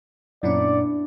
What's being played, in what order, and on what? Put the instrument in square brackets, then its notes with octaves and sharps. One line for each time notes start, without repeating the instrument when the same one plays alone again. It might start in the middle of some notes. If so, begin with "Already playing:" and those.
[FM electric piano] F#2 A#2 C#4 [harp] B3 D4 E4 [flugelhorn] D5